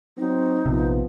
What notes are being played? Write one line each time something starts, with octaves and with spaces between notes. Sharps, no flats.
F#3 C4 D#4
A#1 C3 F3 B3